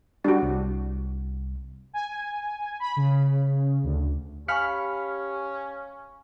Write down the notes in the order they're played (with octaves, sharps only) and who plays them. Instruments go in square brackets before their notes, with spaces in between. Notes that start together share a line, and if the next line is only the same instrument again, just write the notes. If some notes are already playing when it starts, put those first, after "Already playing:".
[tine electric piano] G3 G4 [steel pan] D4 F#4
[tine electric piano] C2
[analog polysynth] G#5
B5
C#3
D2
[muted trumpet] C#4 [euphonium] G4 [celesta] F5 G#5 C#6 [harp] B5 F6 C#7